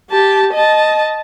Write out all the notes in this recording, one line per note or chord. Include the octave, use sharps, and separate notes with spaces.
G4 A5
D#5 A5